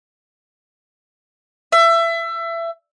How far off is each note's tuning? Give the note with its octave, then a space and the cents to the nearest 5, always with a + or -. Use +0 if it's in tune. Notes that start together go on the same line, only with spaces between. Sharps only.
E5 +25